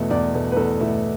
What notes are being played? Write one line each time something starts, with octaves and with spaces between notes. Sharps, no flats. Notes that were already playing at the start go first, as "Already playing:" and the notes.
Already playing: E2 B2 A3
E2 D5
B2 A3
B4
E2 A4
B2 A3 E4